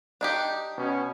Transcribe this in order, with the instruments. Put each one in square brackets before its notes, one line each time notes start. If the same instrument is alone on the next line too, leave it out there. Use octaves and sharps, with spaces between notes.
[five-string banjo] D4 D#4 G4
[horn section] B2 C#4